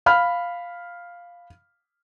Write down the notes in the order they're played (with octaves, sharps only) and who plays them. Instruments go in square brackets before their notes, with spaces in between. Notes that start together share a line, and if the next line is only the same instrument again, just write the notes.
[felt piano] F5 B5 F6